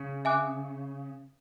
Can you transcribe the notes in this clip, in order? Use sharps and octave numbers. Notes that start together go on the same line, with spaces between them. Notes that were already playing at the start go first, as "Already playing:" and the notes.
Already playing: C#3
E5 G#5 D6 F#6